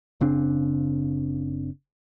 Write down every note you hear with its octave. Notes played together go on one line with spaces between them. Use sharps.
F#1 C#3 C4 D4